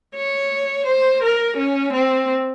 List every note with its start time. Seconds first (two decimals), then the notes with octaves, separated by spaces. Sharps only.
0.16 C#5
0.86 C5
1.23 A#4
1.57 C#4
1.93 C4